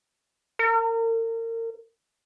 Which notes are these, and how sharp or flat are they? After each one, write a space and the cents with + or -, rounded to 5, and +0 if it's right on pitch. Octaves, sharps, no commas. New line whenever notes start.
A#4 -35